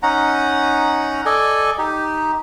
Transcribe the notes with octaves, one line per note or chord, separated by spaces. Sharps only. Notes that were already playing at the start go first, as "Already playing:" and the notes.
C#4 D#4 F#5 A#5
A4 D5 D#5 G#5
D#4 G4